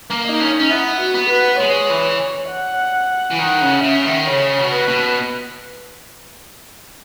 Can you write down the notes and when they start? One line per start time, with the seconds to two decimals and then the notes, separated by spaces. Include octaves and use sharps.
0.10 A#3
0.26 D#4
0.40 C#4
0.60 C#4
0.70 B3 E4
1.00 F#4
1.15 B3
1.30 B4
1.60 G#3 C#5
1.90 E3
2.49 F#5
3.31 E3
3.39 D#3 F#5
3.61 C#3
3.84 C#3 E5
4.06 D#3
4.28 C#3 C#5
4.58 B2
4.73 B4
4.88 B2